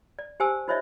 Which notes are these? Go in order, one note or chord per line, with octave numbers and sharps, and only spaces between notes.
D5
G4 C5 G#5 A5 E6
D#4 F4 C5 C#5 D#5 E5